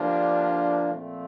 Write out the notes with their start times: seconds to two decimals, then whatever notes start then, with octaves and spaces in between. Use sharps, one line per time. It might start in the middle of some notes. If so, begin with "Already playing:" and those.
Already playing: D3 F3 A#3 D4 G4
0.91 A#2 F3 A3 C4